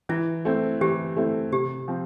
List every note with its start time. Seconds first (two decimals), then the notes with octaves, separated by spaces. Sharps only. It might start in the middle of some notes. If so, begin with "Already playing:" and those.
0.09 E3 E4
0.45 A3 C4 E4
0.81 E3 G4
1.16 A3 C4 E4
1.52 C3 G4
1.88 F3 C4